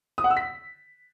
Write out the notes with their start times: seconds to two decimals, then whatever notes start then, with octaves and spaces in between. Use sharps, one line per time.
0.18 D#6
0.24 F#5
0.30 E6
0.37 B6